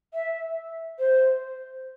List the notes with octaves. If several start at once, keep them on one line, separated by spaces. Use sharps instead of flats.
E5
C5